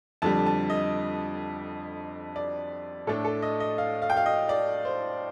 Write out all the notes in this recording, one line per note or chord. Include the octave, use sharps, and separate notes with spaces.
F2 D3 G3 A5
A5
D#5
D5
A2 A3 D4 A4
A4
D#5
D#5
F5
F5
G5
F5
D#5
D5
C5